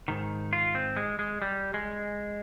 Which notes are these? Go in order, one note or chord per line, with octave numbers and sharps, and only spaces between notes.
G#2 D#3
F4
C4
G#3
G#3
G3
G#3